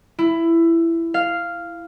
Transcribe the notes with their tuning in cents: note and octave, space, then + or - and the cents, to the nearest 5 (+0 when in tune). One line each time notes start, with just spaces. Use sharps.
E4 +15
F5 -5